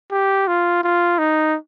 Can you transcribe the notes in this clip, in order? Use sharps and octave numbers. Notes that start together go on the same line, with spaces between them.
G4
F4
F4
D#4